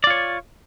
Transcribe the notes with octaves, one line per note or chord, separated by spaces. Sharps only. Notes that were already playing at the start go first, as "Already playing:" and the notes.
F4 C#5 D5